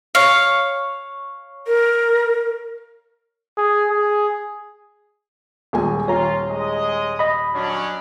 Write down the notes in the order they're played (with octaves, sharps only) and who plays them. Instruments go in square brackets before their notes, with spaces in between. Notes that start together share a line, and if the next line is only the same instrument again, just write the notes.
[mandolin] C#5 F5
[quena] A#4
[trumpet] G#4
G#4
[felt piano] D#1 G#3 G#5
[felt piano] D#1 [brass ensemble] F4 [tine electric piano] C#5 A#5
[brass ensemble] G#3 D#5
[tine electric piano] D#5 B5
[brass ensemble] F#3 C#4 D4